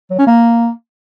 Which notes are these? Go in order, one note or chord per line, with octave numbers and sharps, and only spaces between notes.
F#3
C#4
A#3